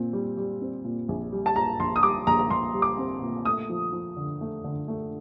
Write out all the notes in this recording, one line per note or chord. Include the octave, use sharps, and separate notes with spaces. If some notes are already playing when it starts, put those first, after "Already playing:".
Already playing: A#2 C4
G3
G3
C4
A#2
A#1
G3
A5
A#2 A#5
A#1 C6
D#6
G3 D6
A#1 A#5
A#5
A#1 C6
G3
D6
C4
A#2
A3 D#6
F3
F3
D3
A3
D3
A3